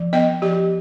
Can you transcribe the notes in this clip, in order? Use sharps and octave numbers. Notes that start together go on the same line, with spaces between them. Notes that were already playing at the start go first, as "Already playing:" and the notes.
Already playing: F3
B3 D#5
F3 G4